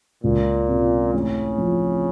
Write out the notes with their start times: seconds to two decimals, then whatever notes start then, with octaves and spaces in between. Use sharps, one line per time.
0.24 C#2 A#2
0.68 C3
1.14 A1 C#3
1.58 F3